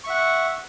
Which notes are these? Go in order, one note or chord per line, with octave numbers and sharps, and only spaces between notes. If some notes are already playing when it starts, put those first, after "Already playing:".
E5 F#5 C#6